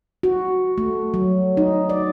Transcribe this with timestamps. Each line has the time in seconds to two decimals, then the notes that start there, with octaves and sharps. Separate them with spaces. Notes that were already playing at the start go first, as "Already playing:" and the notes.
0.23 F#4
0.78 A3
1.14 F#3
1.57 D#4
1.90 D5